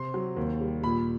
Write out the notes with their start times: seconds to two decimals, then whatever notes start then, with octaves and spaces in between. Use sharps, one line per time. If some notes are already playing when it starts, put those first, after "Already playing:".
Already playing: C3 C6
0.14 F#3
0.37 D#2
0.61 G3
0.84 A#2 B5